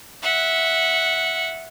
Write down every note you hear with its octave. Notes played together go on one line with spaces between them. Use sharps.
E5 F#5